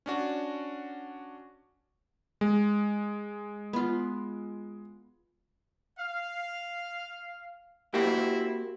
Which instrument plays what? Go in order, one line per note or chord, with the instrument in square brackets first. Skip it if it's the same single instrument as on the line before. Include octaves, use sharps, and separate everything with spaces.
[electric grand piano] C#4 D4 F#4
G#3
[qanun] B3 F4
[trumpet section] F5
[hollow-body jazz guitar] A#3 F#4 G4 [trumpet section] C4 E4